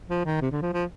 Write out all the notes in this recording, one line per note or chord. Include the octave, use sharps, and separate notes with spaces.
F3
D#3
C3
D3
F3
F3